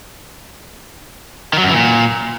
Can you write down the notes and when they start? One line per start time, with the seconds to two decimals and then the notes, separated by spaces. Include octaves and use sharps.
1.53 D#3
1.58 F#3
1.64 F#2
1.69 E3
1.74 A#2